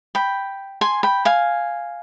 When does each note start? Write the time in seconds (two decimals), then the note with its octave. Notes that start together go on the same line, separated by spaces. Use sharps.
0.15 G5 B5
0.81 G#5 C6
1.03 G5 B5
1.25 F5 G#5